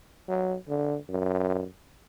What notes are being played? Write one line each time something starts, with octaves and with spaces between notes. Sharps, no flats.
F#3
D3
F#2